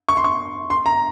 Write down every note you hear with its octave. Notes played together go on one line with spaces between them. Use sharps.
C#6
C6
C#6
C6
A#5